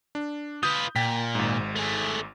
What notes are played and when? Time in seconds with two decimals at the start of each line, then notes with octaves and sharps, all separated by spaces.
0.15 D4
0.63 F4 B4 D#6 G6
0.96 A#2 G5 B6
1.35 G#1 G#2
1.76 A3 G#4